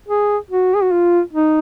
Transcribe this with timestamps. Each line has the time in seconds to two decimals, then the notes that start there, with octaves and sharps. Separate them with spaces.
0.09 G#4
0.51 F#4
0.74 G#4
0.83 F#4
0.92 F4
1.33 D#4